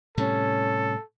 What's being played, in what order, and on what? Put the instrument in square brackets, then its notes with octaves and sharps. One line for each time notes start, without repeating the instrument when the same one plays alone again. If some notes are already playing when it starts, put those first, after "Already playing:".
[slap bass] A2 C3 G3 [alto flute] C#4 [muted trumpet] A4